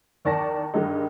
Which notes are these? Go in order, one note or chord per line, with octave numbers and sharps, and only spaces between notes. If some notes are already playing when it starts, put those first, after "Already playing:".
E2 D#3 D5 A5 C#6 A#6
G2 D3 D#3 G3 G#3 D#4